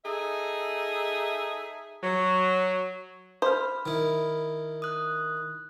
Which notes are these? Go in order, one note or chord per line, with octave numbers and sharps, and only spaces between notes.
D#4 G#4 A4 E5
F#3
C5 B5 F6
D#3 E4
D#6 F#6